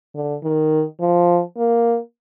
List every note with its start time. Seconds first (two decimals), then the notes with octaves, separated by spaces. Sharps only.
0.15 D3
0.44 D#3
1.01 F3
1.57 A#3